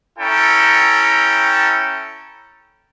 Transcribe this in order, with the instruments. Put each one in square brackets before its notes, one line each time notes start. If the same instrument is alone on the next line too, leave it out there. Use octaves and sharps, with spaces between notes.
[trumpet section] C#4 E4 A4 G5 A#5